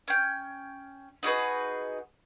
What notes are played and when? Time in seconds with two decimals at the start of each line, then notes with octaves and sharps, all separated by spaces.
0.08 C#4 G5
1.23 D#4 F#4 G#4 B4